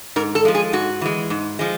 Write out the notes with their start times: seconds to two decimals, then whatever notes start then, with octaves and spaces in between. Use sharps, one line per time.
0.16 G#2 A#4
0.35 A4
0.45 F3 G#3
0.55 G#4
0.73 G#2 F#4
1.01 E3 G#3
1.30 G#2
1.59 F3 G#3